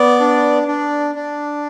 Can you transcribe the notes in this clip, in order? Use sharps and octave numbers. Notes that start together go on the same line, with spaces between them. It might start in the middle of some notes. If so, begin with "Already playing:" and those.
Already playing: B3 D5
D4
D4
D4